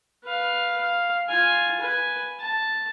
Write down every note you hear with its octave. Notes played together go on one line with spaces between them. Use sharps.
B4 F5
F5
F4 G#5
B4 G#5
A5